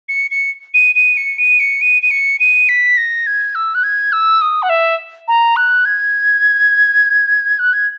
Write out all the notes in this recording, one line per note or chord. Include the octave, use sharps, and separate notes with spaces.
C#7
C#7
D#7
D#7
C#7
D#7
C#7
D#7
D#7
C#7
D#7
B6
A#6
G#6
E6
F#6
G#6
E6
D#6
F#5
E5
A#5
F#6
G#6
F#6
G#6